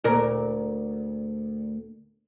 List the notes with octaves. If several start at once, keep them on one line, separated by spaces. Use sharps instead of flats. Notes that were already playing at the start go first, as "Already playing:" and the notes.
D2 A#2 A#4